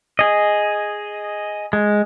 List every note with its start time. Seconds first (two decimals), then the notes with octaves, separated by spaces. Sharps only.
0.19 G#4 D#5
1.73 G#3